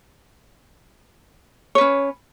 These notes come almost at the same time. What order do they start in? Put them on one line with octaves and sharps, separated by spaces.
C#5 B4 C#4